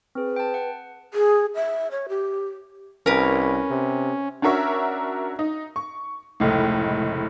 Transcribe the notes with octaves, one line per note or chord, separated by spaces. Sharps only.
C4 G#4 B4
G5 A5
F#5
G#4
E5
C#5
G4
C2 C#4 A#4 B4
C3
C#4 D4 F#4 A#4 E5 C#6
D#4
C#6
F1 C#2 A2